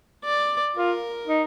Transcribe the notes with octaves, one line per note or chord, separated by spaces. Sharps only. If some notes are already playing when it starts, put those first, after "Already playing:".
D5
F4 A#4
D#4